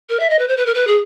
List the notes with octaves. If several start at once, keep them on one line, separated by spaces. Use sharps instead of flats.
A#4
E5
D#5
B4
C5
B4
A#4
B4
G#4